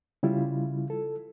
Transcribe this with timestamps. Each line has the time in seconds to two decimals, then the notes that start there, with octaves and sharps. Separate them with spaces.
0.23 C#3 G3 E4 F4
0.90 A4